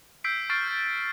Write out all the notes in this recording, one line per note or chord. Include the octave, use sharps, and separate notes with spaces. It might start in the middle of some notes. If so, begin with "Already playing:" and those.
E6 G6 B6 C7 D7
C#6 F6 A6 C7 D7
G6